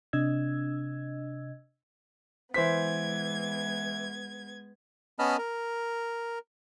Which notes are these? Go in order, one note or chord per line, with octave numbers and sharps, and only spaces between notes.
C3 D4 D#5 E6 G#6
E3 G#3 B3 C5 G#6 B6
B3 C#4 D#5 A5 B5 F6
A#4